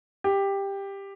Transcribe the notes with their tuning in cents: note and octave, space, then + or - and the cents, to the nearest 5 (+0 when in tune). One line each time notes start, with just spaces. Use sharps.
G4 +10